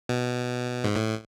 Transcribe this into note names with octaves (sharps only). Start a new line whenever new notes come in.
B2
G#2
A2